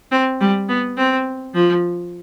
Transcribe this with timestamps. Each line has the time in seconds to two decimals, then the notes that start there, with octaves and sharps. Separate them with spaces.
0.12 C4
0.41 G3
0.69 B3
0.97 C4
1.54 F3